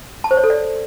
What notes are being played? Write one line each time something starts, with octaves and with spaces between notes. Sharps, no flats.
A5
C5
C#5
A4
D5